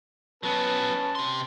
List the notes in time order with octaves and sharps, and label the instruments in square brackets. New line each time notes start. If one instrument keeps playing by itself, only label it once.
[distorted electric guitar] F#3 B3 [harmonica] C#4 B4 A5
[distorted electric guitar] C3 C6